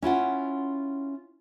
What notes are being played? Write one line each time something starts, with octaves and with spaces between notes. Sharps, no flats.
C#4 E4 F4 F#5